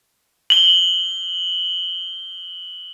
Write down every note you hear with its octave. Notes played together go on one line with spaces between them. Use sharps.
F#7 G7